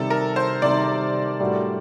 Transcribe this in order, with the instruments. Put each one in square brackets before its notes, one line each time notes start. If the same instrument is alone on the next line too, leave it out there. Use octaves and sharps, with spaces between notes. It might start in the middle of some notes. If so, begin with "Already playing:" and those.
Already playing: [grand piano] C3 D#3 G3 [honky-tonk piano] A4
[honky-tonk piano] A#4
C5
[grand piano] C3 D#3 G3 [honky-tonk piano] D5
[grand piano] A2 G3 D4 F#4